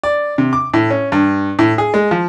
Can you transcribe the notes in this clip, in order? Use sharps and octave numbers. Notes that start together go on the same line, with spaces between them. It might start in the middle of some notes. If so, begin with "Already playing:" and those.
D5
C3
D6
A2
C#4
G2
A2
G#4
G#3
F3